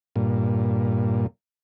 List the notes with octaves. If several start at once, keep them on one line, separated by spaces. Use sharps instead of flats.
G2 A#2